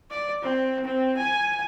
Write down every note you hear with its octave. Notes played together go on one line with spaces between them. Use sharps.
D5
C4
C4
G#5